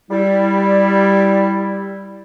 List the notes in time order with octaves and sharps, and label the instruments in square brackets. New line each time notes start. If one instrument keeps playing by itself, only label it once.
[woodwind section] G3 E4